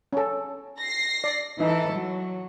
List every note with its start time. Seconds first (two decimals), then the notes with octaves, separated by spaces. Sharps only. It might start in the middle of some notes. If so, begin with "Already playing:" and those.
0.13 C#4 A4
0.80 A#6 C7
1.24 D5
1.60 E3 D#4 A4
1.94 F#3